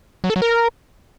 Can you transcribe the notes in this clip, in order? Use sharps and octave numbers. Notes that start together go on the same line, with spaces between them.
F#3
A4
F#3
A#4